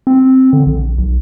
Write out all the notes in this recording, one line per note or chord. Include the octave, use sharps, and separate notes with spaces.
C4
D3
A#1
B1